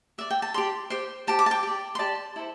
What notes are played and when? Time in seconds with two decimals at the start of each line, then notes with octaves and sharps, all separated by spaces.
0.18 G4 D5 E5
0.31 G5
0.42 A5
0.54 G4 D5 C6
0.90 G4 C5
1.27 G4 C5 A5
1.39 D6
1.46 A5
1.51 G5
1.63 G4 D5
1.95 C6
1.99 G4 D5 A5
2.36 E4 A4 C5